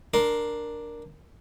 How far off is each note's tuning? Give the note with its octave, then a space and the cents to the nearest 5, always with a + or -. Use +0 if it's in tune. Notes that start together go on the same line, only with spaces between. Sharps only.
D4 +0 A#4 +0 C6 +10